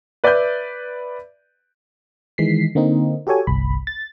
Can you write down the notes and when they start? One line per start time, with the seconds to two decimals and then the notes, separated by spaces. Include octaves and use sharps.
0.24 B4 D5 E5 B5 G6
2.38 D#3 E3 G#3 B6 C7
2.75 D3 A#3 C4 D#4
3.27 F#4 G4 A4 C#5 G#5
3.47 G1 C2 B5
3.87 A6